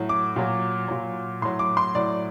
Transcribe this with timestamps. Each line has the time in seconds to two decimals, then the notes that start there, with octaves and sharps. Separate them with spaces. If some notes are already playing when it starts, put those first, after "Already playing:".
Already playing: A2 F#3
0.09 D6
0.36 A#2 F#3
0.88 A#2 F#3
1.41 A2 F#3 C6
1.59 D6
1.77 C6
1.95 A2 F#3 D5